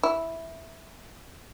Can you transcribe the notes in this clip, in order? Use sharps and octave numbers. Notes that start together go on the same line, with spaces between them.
E4